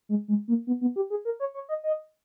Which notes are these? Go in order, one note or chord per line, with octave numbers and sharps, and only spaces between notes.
G#3
G#3
A#3
B3
B3
G4
G#4
A#4
C#5
C#5
D#5
D#5